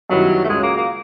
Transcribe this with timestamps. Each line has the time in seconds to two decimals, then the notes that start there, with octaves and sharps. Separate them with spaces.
0.10 F#2 D#3 F#3 G3 B3 E4
0.44 A3
0.49 C#2 C#3 F#3 G#3
0.63 A#3
0.76 A#3